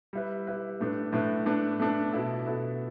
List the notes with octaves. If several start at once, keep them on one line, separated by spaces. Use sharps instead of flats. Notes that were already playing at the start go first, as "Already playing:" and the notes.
G3 E4 B4
G3 E4 B4
A2 A3 D4 B4
A2 A3 D4 B4
A3 D4 B4
A3 D4 B4
B2 B3 E4 A4
B2 B3 E4 A4